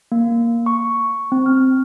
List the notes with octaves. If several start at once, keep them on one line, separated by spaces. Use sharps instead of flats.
A#3
C#6
C4
F6